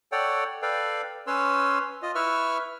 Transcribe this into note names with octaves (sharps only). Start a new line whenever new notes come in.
A4 C#5 D5 F#5 G5
A4 B4 D5 F5 G5
C#4 B4 C#5 C6 E6
F4 D#5
E4 B4 E5 C#6 E6 F6